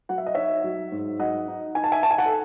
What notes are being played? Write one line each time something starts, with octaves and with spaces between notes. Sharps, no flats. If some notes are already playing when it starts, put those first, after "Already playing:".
F#3 F#5
E5
D#5
D#4 C#5 E5
F#3
G#2
F#3 D#5 F#5
D#4
D#4 G#5
A5
E5 G#5
D#4 A5
G#5
F#5 A5
A4